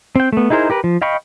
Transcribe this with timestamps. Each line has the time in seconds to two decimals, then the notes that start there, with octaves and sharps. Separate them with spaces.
0.16 C4 G5
0.33 A3 B3
0.50 D#4 E4 G#4 A#4 C5
0.70 G4 A#4 B4
0.84 F3
1.02 D#5 F5 G5 B5 C#6